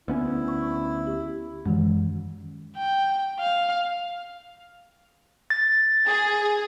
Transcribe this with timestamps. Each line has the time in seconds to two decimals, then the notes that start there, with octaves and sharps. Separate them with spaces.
0.08 D2 B3 C#4 E4
0.48 C#6
1.07 G4
1.66 F#2 D#3 E3 G#3
2.76 G5
3.40 F5
5.50 A6
6.07 G#4